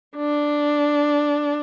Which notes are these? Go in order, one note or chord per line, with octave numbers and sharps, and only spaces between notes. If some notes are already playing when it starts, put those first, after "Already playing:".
D4